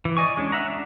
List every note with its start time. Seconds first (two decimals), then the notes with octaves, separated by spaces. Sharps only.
0.05 E3
0.17 D5 D#5 G#5 C#6
0.37 G#3 C#4 D4
0.52 E5 F#5 A#5
0.70 D4